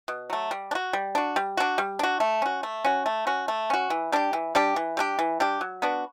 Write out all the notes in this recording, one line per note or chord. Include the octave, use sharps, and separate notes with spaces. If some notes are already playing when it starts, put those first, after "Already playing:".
B2
F#3 A3
G3
D4
F#4
G3
D4 F#4
G3
D4 F#4
G3
D4 F#4
A3
C#4 F#4
A3
C#4 F#4
A3
C#4 F#4
A3
C#4 F#4
E3
G3 D4 G4
E3
G3 D4 G4
E3
G3 D4 G4
E3
G3 D4 G4
F#3
B3 D4 F#4